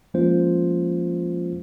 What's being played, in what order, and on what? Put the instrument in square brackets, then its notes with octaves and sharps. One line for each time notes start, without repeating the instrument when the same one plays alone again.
[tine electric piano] F3 G#3 A#3 C#4 F4 C5